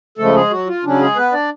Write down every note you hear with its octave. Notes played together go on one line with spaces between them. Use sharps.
C#3 F3 G#3 A3 A4
G#3 G#4
F#3 F#4
F4
C#3 F#3 C#4 D4
G#3 G#4
B3 B4
D4 D5